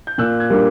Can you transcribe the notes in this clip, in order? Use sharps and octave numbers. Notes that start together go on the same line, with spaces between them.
G6
A#2 E6 F#6
F#6 G#6
G3 A#3 D4